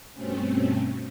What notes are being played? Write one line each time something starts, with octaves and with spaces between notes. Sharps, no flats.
G2 B2 A3 C4 C#4